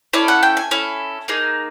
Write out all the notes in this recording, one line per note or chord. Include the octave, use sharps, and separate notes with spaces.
C#4 E4 A4 D5
F#5
G5
G#5
C#4 E4 A4
A#3 D#4 G#4